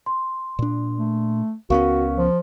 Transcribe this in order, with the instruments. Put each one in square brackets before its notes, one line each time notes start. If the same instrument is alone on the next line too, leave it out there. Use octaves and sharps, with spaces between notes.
[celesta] C6
[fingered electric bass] A#2 D4
[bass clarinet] A3
[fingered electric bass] C#2 B3 C#4 [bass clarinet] F#4 [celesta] A#4 F5 C#6
[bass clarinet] F3